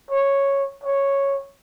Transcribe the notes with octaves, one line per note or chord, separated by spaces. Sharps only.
C#5
C#5